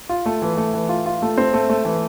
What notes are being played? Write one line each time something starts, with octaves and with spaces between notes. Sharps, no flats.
F4
A3
E3
A3
E3
F4
F4
A3
C4
A3
A3
E3